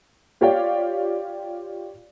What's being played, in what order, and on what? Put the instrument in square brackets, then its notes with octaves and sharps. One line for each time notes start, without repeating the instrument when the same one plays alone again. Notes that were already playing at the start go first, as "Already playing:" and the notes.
[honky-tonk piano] F4 G4 C#5 D5 F5 G5